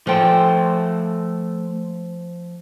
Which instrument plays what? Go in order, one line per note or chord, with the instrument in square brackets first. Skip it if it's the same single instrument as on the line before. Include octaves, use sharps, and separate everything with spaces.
[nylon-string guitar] F3 G5 [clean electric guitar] A3 C5